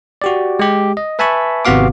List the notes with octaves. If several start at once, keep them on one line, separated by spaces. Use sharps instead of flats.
F#4 G4 D5
G#3 G4
D#5
B4 E5 G#5 A5 B5 C#6
G#1 C3 B3 F#4 F5 D6